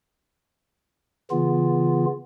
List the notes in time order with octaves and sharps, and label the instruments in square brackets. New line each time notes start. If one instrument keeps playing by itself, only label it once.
[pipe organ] C#3 E3 B3 F4